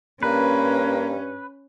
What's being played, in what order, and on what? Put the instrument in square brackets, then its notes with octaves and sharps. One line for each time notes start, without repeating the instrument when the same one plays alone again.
[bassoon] G2 [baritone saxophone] A#3 [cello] C#4 [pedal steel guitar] B4